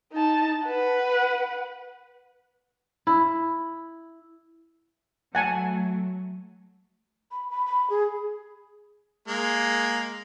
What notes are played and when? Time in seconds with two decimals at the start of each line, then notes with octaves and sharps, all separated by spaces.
0.12 D#4 A5
0.67 B4 F#5
3.07 E4
5.35 F#3 A3 F#5 G#5 A5
7.32 B5
7.51 B5
7.66 B5
7.90 G#4
9.28 G#3 A#3